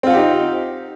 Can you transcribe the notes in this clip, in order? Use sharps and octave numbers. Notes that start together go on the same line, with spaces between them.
C4 D#4 F4 G4 F#5